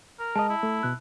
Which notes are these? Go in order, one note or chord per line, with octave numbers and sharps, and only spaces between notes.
A#4
G#3 D#5 A5
E4
A3
B2 F#6